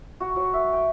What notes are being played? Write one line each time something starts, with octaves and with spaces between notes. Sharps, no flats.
F#4
F#3
E5
G5